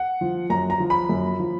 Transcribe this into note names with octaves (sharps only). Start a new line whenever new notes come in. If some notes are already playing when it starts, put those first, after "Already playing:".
Already playing: F#5
F3
F#2 A#5
A#5
F3
B5
F#2
F3